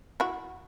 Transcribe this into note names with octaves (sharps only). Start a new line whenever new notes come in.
E4 F#4